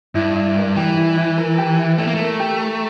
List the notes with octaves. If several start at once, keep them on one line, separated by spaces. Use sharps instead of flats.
G2 E4
E4
A#4
E3 G4
E4
E4
A#4
G4
E4
A3 E4
A#3
A3 A#4
G4
A#5